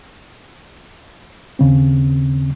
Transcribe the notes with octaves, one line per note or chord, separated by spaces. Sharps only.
D#2 C#3 C4